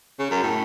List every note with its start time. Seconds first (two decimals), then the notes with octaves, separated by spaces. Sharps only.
0.19 C#3
0.31 F#2
0.43 A2